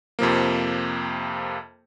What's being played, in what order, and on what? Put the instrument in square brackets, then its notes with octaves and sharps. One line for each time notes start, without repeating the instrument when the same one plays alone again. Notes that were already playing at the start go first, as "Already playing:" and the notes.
[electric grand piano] F2 C3 F3 A#3